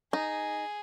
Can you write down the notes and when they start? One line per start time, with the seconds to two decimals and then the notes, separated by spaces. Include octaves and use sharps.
0.13 D#4 G#4